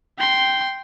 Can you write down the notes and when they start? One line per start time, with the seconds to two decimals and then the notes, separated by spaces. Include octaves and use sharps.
0.18 G5 C6